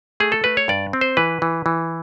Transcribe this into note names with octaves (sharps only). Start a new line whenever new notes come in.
A3 G#4
A4
A3 B4
C#5
G2 D5
C4
C5
E3 B4
E3
E3